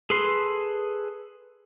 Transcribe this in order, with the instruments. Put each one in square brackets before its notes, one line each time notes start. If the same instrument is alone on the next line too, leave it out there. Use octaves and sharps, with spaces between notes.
[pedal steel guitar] G#4 A4 B4 C6